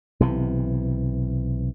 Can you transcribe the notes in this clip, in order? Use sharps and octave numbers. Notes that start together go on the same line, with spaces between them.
B1 C3 E3